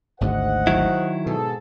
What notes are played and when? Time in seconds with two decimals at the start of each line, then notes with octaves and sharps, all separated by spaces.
0.21 G#1 D2 G#2 C5 D#5 F#5
0.67 D#3 F#3 E4
1.26 G#2 B2 G#4 A4